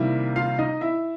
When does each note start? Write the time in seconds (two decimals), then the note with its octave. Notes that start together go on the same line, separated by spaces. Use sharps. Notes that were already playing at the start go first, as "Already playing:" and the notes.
Already playing: C3 D#3 G3 A#3 E4 E5
0.36 F4 F5
0.59 D#4 D#5
0.81 E4 E5